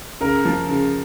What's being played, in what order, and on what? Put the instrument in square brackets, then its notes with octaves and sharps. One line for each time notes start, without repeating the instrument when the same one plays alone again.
[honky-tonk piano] C#3 [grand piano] A#4
[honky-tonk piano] F3
C#3